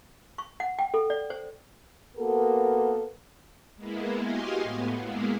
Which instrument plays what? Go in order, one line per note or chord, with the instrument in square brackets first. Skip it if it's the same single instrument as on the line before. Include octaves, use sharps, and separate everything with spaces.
[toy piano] C#6
F#5
G5
A4
D5
C5
[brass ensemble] A#3 B3 F#4 A4 A#4
[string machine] G#3 A#3 B3 E4
F#4 G4 D#5 F5 G#5 C6
A2 B3
G#3 A#3 B3 E4 G#4